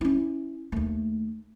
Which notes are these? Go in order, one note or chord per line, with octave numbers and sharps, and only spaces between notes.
C#4 E4
D#2 A3